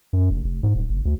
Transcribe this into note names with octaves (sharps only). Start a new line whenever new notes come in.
F#2
F1
F1
G#2
D#1
F#1
D2